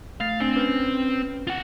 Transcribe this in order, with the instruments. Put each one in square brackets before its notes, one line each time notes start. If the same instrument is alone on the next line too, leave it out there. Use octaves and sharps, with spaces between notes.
[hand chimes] A3 A6 C7 [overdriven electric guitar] F5
[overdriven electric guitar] C4 [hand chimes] D4
[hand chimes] C#4 B4
[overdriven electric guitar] F4 F#5